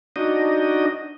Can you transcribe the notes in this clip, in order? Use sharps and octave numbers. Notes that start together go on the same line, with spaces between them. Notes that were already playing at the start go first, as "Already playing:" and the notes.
D4 D#4 F#4 D#5